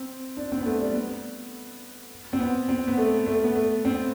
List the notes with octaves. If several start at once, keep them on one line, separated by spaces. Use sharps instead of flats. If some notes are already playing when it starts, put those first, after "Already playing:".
Already playing: C4
D4
C4
B3
A3
G3
B3
C4
B3
C4
B3
A3
A3
B3
A3
C4